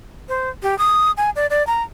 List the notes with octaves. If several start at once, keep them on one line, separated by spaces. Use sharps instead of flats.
C5
G4
D#6
G#5
D5
D5
A#5